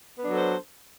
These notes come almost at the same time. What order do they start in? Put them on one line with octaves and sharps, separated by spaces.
B3 D4 F#3 A4 C5